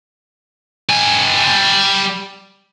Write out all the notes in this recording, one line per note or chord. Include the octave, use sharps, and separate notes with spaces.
G3 G#5